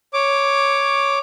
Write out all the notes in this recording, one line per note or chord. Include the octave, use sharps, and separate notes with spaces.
C#5 D6